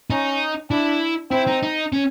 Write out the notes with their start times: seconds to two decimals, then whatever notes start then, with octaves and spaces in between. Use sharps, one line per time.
0.10 C#4 D#4
0.70 D4 E4
1.31 C4 E4
1.47 D#4
1.63 D#4
1.93 C#4